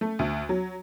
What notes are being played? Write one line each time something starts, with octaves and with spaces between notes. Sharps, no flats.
A3
D2
F#3